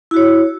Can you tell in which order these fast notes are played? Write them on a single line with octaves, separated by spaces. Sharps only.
E4 F#4 C#5